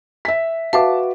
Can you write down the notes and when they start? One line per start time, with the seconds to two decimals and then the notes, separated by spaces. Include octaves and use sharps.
0.25 E5 B6
0.73 F#4 B4 E5 F5 A5 D6